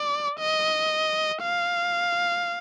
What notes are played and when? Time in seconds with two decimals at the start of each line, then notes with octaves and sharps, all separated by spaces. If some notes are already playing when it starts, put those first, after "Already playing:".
Already playing: D5
0.39 D#5
1.42 F5